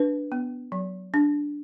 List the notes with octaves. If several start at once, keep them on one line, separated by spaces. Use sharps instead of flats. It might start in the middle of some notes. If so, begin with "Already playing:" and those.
Already playing: D4 B4
B3
F#3
D4